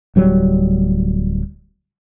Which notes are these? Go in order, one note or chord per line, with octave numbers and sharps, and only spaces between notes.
D1 F#3 G3